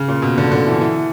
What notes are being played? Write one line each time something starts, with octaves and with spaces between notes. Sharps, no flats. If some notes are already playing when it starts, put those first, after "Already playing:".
Already playing: C#3
A#2
B2
D3
D3
E3
E3